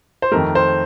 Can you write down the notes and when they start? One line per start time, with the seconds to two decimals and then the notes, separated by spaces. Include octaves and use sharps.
0.22 C5
0.32 F2 D#3 A3 A#4
0.55 C5